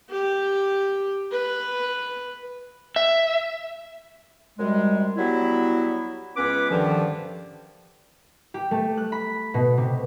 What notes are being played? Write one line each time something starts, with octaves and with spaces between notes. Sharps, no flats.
G4
B4
E5
F#2 C3 G3 G#3
F#3 G3 B3 E4
C#2 B3 C#4 B4 D6
G2 D3 D#3 F3
G4
A3
F#6
B5
B2
C3